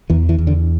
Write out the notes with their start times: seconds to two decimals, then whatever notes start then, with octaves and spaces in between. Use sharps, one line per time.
0.10 E2 E3
0.29 E3
0.38 E2
0.47 D3